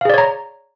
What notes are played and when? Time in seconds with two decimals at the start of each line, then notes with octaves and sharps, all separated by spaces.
0.01 F5
0.05 G#4
0.10 D5
0.14 C#5
0.18 A#5